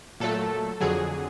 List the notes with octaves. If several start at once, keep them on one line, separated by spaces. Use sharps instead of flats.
A#2 F#3 A3 A4
F2 D3 F#3 G#4